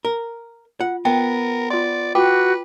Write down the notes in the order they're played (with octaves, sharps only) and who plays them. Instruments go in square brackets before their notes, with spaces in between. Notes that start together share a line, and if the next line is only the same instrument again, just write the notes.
[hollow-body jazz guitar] A#4
[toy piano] F4 [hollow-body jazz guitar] F#5
[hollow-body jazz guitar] B3 [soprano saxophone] A#4 [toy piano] G5
[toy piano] F4 C6 [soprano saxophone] D5
[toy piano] F4 G5 D6 [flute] F#4 [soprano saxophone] B4